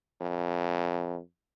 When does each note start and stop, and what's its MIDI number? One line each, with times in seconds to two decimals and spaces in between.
0.21 1.19 41